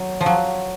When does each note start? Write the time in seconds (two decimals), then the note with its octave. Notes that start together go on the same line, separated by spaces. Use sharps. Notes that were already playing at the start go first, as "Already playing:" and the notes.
Already playing: F#3
0.21 F3
0.26 F#3